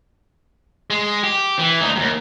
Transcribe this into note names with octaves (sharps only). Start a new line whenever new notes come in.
G#3
G4
E3
D2 D#4
D#2 G#2